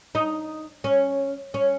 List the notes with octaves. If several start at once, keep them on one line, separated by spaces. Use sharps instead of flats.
D#4
C#4
C#4